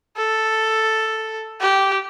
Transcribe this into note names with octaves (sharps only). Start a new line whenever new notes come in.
A4
G4